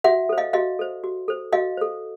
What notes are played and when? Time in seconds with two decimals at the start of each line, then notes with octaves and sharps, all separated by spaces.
0.04 F#4 E5 F#5
0.29 A4 C5
0.38 D#5 F5
0.53 F#4 D#5 F5
0.79 A4 C5
1.04 F#4
1.28 A4 C5
1.53 F#4 D#5 F5
1.77 A4 C5